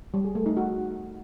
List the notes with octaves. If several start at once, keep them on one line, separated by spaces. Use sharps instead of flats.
G3
G#4
A3
D#4
F#4